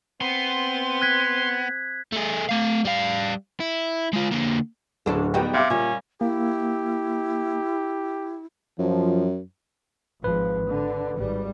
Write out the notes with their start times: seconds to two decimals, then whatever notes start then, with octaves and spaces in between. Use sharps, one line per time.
0.21 B3 C4 C6
1.02 F#6 G#6 B6
2.13 A3 G#4
2.49 A3 F5
2.85 G3 F5
3.60 E4
4.13 G#3 F4
4.31 D3 A#3
5.06 D1 C#3 D4 A4
5.34 G3 B3 D#4 F#4 G5
5.54 C3 E5 F5 D6
5.70 A#2 G3 A#3 C#4
6.21 A#3 E4 G4
8.79 F#2 F3
10.24 G#1 F3 B4
10.69 D3
11.18 G#1 G3